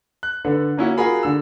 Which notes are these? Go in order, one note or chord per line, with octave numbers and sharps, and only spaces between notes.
F#6
D3 A4 B4
A#3 C#4 E4 F#4
F4 F#4 G#4 A#4 B5
D3 E6